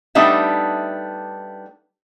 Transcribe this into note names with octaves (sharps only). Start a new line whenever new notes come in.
G3 A3 B3 D4 D#4 E5